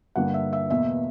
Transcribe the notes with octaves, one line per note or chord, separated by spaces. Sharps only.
G2 D3 G3 A#3 F#5
E5
E5
E2 B2 A#3 E5